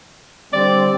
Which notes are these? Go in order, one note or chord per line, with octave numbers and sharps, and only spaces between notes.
D3 G3 C4 D5